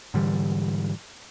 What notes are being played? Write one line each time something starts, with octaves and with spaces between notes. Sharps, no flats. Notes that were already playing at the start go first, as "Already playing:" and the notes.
G#2 D3 E3 G3